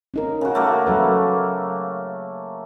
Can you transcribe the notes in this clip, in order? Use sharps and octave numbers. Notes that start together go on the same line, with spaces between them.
C#4 D#4 A#4
C#3 F#4
A3 A#3 F#4
F#3 A4 B4